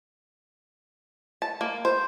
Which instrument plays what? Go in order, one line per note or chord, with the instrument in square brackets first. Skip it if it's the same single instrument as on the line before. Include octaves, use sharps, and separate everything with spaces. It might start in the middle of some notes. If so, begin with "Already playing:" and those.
[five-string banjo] A5
A#3
C5